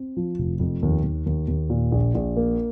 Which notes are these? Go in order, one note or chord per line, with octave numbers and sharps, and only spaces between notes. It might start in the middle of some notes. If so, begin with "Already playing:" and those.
Already playing: C4
F3
F1
F2
D#2
D#2
D#2
D#2
A#2
A#1
A#1
A#3